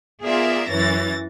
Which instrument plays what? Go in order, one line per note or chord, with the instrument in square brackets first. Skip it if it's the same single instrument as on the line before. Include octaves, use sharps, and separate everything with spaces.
[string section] B3 F4 G#4 A#4 D5 E5
F#2 E3 C#4 A6 A#6